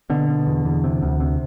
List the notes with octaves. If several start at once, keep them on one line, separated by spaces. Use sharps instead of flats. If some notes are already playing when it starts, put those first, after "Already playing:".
B2 D3
B2
E2
E2
C3
D2
C3